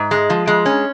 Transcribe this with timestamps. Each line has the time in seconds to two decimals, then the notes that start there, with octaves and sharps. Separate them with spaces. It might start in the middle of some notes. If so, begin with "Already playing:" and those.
Already playing: G#2
0.11 G#3
0.30 F3
0.47 G#3
0.66 C#4